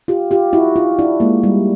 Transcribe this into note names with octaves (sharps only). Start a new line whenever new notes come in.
F4 G4
F4 G4
E4 F#4
D#4 F4
D4 E4
G#3 A#3
G3